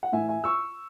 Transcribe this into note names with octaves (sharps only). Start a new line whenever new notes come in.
F#5
A2 E3 E5 G#5
E5 G#5
C#6 E6